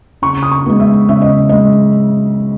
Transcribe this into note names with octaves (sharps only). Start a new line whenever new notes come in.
C#3 C#6
D#6
C#6
G#3 B3
E5
C#3 E5
D#5
G#3 D#5